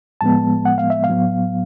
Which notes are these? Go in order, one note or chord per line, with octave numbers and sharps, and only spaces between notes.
A2 F3 G#3 B3 A5
F#5
F5
E5
F5
A2 F#3 B3